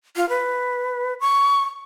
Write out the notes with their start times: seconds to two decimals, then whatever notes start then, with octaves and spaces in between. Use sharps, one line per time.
0.16 F4
0.29 B4
1.20 C#6